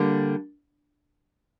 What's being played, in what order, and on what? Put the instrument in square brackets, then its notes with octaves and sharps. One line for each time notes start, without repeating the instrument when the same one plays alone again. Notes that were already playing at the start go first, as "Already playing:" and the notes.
Already playing: [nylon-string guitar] D3 G3 A#3